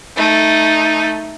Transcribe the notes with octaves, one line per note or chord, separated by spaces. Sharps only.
A3 D#4